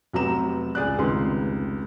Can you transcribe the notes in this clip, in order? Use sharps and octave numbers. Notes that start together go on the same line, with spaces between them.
F1 F#3 B3 G4 A#5 E7
C#2 G#4 D5 F#6
F1 C#2 D#3 B4 C6